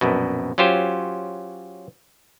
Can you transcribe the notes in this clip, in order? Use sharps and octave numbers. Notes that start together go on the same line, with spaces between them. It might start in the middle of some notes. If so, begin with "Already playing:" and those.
A#1 F#2 B2
F#3 C#4 F4 G4 C5